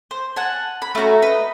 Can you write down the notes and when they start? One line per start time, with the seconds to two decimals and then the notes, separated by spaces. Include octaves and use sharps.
0.11 C5
0.36 F#5 G#5 A5
0.82 B5
0.95 A3 C#4 F#4 A#5
1.22 B4 D#5